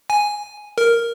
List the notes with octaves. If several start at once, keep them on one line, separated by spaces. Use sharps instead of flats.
G#5
A#4